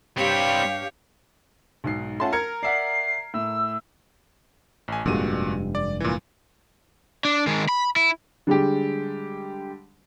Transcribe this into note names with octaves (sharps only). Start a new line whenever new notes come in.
G2 G3 C4 G4 C#5 F5
B1 G#2 C7
A3 C#4 F4 F#5 A5 C6
A#4 G#6 C#7
D5 E5 F#5 C7
A2 E6
A1 G#5
F1 G2 A#2 G#3 F#4 D#7
D5
A#2 E3
D4
D#3 G#3
B5
E4
D3 G3 G#3 G4